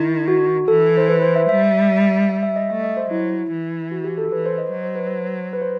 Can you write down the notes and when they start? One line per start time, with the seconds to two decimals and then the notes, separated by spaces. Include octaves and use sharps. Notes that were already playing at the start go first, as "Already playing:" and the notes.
Already playing: D#3 E4
0.28 F#4
0.68 E3 A4
0.98 C5
1.08 B4
1.22 C5
1.36 E5
1.49 G3 E5
2.29 E5
2.43 E5
2.56 D#5
2.70 A3 E5
2.83 D#5
2.97 C5
3.10 F#3 E4
3.51 E3
3.91 F#4
4.04 G4
4.18 A4
4.32 E3 B4
4.46 C5
4.58 D#5
4.72 F#3 D#5
4.83 C5
4.95 B4
5.08 C5
5.53 B4
5.62 C5